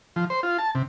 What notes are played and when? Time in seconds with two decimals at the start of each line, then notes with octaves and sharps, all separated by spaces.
0.16 F3
0.30 C5
0.43 F4
0.58 A5
0.75 C3